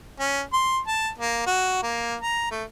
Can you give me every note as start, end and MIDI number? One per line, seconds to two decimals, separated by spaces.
0.20 0.42 61
0.53 0.79 84
0.87 1.09 81
1.18 1.43 58
1.47 1.78 66
1.83 2.16 58
2.22 2.50 82
2.51 2.64 57